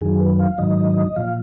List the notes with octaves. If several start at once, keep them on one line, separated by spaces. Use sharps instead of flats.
F#2 D#3 F#3 G#4
B4
F5
G#2 D#3 F#3 D#5
A#2 F3 F5